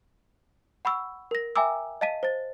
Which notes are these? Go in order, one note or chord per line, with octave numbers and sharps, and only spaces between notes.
F#5 B5 C#6 E6
A#4 A#6
E5 G5 G#5 A#5 D6 E6
D#5 F5 A5 B6 D#7
C5 A6